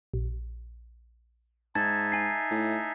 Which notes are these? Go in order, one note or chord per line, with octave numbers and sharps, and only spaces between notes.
A#1
G#2 D#4 E5 A5 G#6 A6
G#5 C7
A2